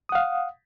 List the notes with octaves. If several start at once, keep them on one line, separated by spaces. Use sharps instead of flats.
F5 F#5 D#6